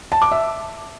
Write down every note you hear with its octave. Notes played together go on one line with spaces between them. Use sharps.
A5
D6
E5